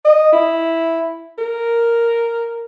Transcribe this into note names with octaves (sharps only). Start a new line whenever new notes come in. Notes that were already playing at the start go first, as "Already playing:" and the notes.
D#5
E4
A#4